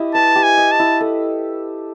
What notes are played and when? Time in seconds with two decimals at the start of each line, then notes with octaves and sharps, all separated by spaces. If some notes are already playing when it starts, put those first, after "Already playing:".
Already playing: E4 G4 D#5
0.15 B4 A5
0.36 G4
0.43 G#5
0.58 D#5
0.72 A5
0.79 E4
1.01 A4